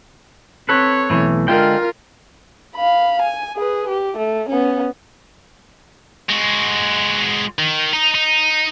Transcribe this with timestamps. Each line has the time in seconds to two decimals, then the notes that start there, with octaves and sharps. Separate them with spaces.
0.69 C4 A4 B4 C#5
1.10 B1 E3 A3
1.48 D3 G#3 F4 A#4 G5
2.76 F5 B5
3.22 G#5
3.56 G#4 B4
3.89 G4
4.17 A3
4.49 B3 C#4
6.30 G#3 F#4
7.59 D#3
7.93 D#4
8.14 D#4